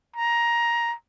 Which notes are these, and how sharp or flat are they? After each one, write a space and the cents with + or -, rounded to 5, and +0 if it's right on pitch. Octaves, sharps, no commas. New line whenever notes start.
A#5 +15